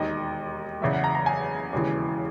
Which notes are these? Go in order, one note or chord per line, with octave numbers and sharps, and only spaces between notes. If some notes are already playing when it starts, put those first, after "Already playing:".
Already playing: E1 D#2 D#3 D#5
F#1 E2 C#3 E5
F#5
A#5
A#5
G#5
E1 D#2 C#3 E3